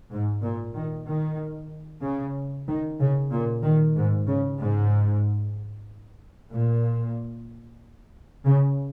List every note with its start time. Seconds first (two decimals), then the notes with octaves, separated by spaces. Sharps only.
0.11 G#2
0.42 A#2
0.74 D#3
1.07 D#3
2.02 C#3
2.67 D#3
3.00 C#3
3.31 A#2
3.63 D#3
3.95 G#2
4.27 C#3
4.60 G#2
6.52 A#2
8.44 C#3